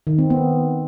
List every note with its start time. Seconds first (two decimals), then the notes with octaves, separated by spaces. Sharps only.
0.07 D#3
0.19 C4
0.30 B3